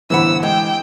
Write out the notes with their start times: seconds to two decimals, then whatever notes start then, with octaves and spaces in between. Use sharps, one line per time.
0.10 G1 D#2 A2 E3 C5 F#5 B5 E6
0.43 D3 G#3 G4 D#5 G5